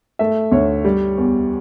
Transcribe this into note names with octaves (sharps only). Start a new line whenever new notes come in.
A3 E5
D2 C#5
G3
E2